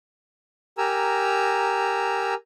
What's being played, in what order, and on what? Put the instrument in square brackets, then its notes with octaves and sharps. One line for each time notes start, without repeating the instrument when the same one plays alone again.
[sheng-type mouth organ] G4 A#4 G#5 A#5 E6